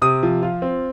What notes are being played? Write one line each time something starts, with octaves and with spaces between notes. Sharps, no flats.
C3 D#6
F3
F4
C4